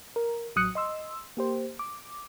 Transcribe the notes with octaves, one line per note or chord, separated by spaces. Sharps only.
A#4
A1 F#3 D#6 F#6 C#7
D#5 C6 E6
A#3 G4 C5
D6